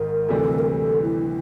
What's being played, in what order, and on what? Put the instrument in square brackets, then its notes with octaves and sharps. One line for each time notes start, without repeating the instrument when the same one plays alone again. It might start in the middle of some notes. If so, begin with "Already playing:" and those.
Already playing: [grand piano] G#1 G#2 [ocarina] A#4
[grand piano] D2 C3 E3 G3 [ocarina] A4
[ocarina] A#4
A4
E4